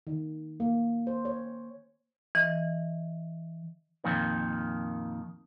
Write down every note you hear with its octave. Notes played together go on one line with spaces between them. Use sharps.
D#3
A#3
C5
C#5
E3 D#5
F2 A#2 D#3